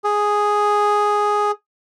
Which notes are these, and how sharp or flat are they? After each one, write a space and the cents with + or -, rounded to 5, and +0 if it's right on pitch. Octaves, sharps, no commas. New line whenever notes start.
G#4 +0